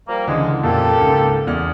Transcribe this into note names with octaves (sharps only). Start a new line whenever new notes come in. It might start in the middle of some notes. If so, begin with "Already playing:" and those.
F3 G3 A#3
C#2 D3 E3 G#3
F2 A#2 A#3 G4 A4
C#2 G#2
E2 D5 F6